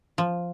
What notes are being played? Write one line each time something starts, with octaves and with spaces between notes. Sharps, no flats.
F3